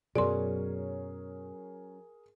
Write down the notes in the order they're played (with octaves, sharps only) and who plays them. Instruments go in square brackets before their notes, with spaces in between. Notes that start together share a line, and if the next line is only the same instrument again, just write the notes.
[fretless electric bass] F#2 B2 [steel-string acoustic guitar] F#3 C#4 [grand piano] G#4 A#4 [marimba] D5 C6